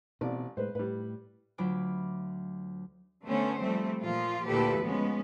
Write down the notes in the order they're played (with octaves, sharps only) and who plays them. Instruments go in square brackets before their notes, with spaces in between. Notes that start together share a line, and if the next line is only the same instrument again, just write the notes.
[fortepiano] A1 D5 [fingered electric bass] B2 C4
[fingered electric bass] A2 G#3 [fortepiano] B4 C5
[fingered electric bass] A2 [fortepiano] G3 B4
[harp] D2 F#3 D4 F4 B5 D6
[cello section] D3 A3 B3 C#4 C5
F3 G3 A3 C4
A#2 F3 A#3 F4
D2 A#2 E4 G4 A4 B4
F3 G#3 B3 C#4